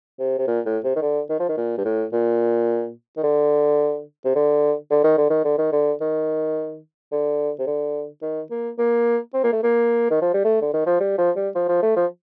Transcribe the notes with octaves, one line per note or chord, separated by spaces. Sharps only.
C3
C3
A#2
A2
C3
D#3
D3
D#3
F3
D#3
A#2
G2
A2
A#2
D#3
D3
C3
D3
D3
D#3
D3
D#3
D3
D#3
D3
D#3
D3
C3
D3
D#3
A#3
A#3
C4
A#3
A3
A#3
D#3
F3
G3
A3
D3
D#3
F3
G3
F3
G3
F3
F3
A3
F3